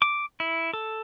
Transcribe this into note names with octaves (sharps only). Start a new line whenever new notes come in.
D6
E4
A4